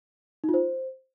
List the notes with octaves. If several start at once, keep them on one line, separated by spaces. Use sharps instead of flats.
D#4
F4
C5